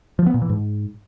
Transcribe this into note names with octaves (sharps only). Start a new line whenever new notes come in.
F3
B3
A#2
E3
G#2